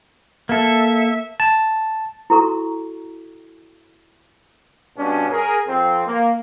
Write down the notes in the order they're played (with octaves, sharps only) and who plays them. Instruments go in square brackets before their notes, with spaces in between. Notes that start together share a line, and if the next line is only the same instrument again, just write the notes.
[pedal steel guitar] A#3 A4 [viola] E5
[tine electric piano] A5
[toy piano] E4 F#4 A4 A#5 C#6
[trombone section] G2 B2 C#4 D4
G#4 A#4
F2 C4
A#3